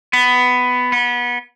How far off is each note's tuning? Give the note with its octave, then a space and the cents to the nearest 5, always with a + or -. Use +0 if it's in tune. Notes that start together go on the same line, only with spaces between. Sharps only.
B3 +10
B3 -25